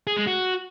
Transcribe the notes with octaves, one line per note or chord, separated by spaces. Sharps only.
G#4
G#3
F#4